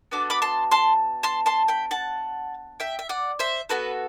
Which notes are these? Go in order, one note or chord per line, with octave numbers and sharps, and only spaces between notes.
B3 D4 F#4 A4 D6
B5 D6
A5 C6
A5 C6
A5 C6
A5 C6
G5 B5
F#5 A5
E5 G5
E5
D5 F#5
C5 E5
B3 F#4 A4 B4